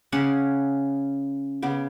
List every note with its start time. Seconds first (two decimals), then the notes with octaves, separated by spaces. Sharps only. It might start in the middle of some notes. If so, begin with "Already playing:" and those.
0.12 C#3 C#4 F#5 D6
1.62 C#3 B3 D6